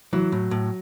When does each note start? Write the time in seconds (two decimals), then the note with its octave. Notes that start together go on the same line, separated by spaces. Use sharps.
0.13 E3 F#3
0.32 A2
0.51 A2